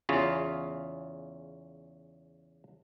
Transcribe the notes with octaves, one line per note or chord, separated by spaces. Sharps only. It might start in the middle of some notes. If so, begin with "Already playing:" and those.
E2 C#3 F4